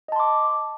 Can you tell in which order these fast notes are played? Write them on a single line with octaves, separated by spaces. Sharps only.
D#5 A5 C6 D6